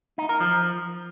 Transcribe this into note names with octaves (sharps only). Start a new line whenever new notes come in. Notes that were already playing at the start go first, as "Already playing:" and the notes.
D#4
A#4
F3